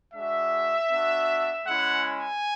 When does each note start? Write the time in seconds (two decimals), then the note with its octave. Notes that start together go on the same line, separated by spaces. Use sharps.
0.13 G#3 D4 F#4 E5
0.90 B3 D4 F#4
1.66 G#3 C#4 E4 F#5
2.05 G#5